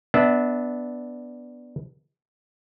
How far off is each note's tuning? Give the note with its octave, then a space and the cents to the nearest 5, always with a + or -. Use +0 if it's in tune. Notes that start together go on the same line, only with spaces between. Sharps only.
B3 +0 D4 +0 E5 -20